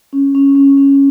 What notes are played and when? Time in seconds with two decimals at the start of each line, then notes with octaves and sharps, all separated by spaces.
0.13 C#4
0.35 C#4
0.55 C#4
0.77 C#4